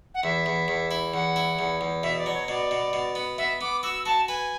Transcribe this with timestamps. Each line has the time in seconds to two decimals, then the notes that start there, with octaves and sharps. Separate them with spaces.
0.14 F#5
0.23 E2 E5
0.46 E2
0.68 E2
0.91 E4
1.14 E2 F#5
1.36 E4
1.59 E2
1.81 E2
2.03 B2 E5
2.18 D5
2.26 F#3
2.33 C#5
2.48 B2 D5
2.71 B2
2.93 B2
3.15 B3
3.38 B3 E5
3.61 B3 D6
3.83 F#4 E6
4.06 F#4 A5
4.28 B4 G#5